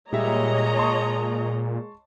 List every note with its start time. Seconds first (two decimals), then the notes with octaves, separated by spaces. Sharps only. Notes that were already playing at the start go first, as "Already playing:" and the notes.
0.13 A#2 G3 G#3 C#5 D#5 E5 A#5
0.77 A#2 A5 C6 C#6